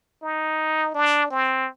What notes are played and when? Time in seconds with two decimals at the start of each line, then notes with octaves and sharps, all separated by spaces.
0.22 D#4
0.95 D4
1.30 C4